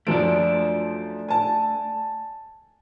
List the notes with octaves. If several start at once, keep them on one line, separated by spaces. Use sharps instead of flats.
F#2 F3 A3 D4 D7
G#5 A5